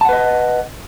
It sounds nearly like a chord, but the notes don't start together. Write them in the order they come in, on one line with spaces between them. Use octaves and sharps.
A5 F#5 B4 D#5